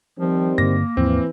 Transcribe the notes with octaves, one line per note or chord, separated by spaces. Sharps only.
D#3 F3 G3 C4
G2 D3 A#3 A#6
D#2 G#2 E3 F3 C4